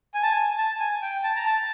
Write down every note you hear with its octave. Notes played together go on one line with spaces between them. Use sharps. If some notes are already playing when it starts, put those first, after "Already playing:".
G#5
A5
G#5
A5
G#5
G5
A5
A#5
A5